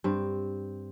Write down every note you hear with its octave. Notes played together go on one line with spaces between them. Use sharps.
G2 C4